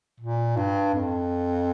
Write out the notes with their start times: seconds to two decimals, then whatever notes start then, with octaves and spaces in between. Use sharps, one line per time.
0.20 A#2
0.57 G2
0.94 F2